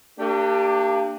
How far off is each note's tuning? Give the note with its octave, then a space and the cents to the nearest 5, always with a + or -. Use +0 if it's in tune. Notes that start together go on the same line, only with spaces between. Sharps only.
A#3 -40 D4 +10 G4 +0